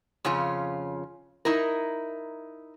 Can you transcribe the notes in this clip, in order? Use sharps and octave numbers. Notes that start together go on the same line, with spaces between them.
F2 C#3 C#4 F4
D#4 E4 A#4